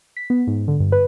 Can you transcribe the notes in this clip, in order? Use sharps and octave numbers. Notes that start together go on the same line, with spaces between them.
B6
B3
G#2
D3
G2
B4